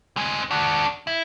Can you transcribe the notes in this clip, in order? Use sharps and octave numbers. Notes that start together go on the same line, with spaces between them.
C4 G#4
D4 F#4
E4